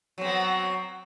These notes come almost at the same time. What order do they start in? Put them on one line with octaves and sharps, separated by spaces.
F#3 C4 B3